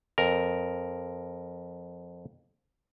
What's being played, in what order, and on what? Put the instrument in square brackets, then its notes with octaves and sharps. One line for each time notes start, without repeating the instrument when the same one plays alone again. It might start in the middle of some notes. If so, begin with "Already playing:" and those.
[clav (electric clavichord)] F2 A#4